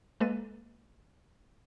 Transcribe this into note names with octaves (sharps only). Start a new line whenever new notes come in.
G#3 A#3 A4 B4 A6 D#7